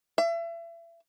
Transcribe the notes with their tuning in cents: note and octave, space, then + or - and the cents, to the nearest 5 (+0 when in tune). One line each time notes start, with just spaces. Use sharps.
E5 +35